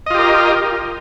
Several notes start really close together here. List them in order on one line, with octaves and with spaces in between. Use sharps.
D#5 F4 G4 A#4